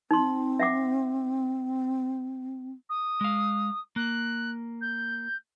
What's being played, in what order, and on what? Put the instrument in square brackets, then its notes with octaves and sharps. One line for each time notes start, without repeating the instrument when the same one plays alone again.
[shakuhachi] C4 [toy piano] D#4 C6
[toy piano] E5 F#5 D6
[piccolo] D#6
[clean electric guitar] G#3 F5
[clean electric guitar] A#3 [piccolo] F#6
[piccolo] G6